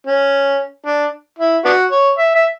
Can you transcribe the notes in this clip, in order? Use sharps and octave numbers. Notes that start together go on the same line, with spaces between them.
C#4
D4
E4
B3 D4 F#4
C#5
E5
E5